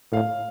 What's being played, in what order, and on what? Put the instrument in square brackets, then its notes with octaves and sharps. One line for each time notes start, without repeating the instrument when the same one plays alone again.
[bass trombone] A2 [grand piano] F5